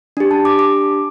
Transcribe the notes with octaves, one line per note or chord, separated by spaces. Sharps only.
D4 G4
A5
D6
D6